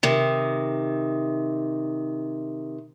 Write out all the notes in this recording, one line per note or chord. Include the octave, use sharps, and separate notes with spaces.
C3 D#3